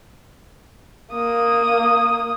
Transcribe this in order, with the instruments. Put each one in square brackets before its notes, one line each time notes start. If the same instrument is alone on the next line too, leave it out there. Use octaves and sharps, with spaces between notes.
[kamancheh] A#3 D#6